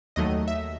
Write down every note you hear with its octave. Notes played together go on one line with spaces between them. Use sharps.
D#2 D#3 F#3 A3 D#5
E5